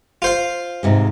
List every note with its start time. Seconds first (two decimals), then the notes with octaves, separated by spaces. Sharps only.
0.22 F4 C5 F5
0.83 G#2 C3 G#3